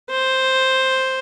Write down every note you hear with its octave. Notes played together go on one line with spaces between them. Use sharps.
C5